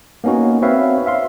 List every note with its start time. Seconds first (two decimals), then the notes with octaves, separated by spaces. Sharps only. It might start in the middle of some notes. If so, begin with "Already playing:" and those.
0.24 A#3 B3 C#4 D#4 F#4
0.62 C4 F#4 B4 C#5 E5 F5
1.06 E5 F5 C6